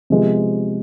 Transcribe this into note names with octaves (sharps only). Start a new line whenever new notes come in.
C3 F3 G#3 B3